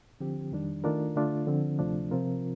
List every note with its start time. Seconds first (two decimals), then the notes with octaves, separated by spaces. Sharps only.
0.20 D3 F3 C4 G4
0.52 F2 D#3 G3 D4
0.84 D#3 A3 D4 F4 A#4
1.16 D3 A3 D4 F4
1.47 D3 F3 C4
1.79 D2 C3 F3 A3 D4
2.11 C3 F3 C4 F4 A#4